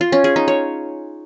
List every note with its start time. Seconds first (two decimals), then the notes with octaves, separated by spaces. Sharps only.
0.01 F4
0.12 C#4
0.24 G#4
0.36 D#4
0.48 C#5